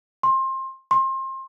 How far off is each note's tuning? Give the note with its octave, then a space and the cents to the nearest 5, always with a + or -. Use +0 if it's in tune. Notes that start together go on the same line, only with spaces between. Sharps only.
C6 +25
C6 +30